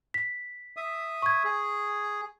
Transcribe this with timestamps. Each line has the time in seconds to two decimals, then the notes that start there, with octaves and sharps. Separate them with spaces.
0.14 B6
0.77 E5 D#6
1.22 C#6 G#6
1.44 G#4